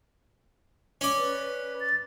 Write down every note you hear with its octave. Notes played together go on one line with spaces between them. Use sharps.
C#4 D5
B4
A6